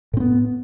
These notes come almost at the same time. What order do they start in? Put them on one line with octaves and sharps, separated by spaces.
A2 C4 B3